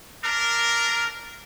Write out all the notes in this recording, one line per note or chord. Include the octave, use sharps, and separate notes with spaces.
D4 A#4